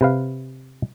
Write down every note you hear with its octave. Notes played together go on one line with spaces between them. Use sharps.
C3 B4 F5